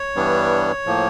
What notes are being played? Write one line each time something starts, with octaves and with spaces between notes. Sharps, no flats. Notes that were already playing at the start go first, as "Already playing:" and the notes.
Already playing: C#5
G2 E3 G3 B3 D4
A2 F3 A#3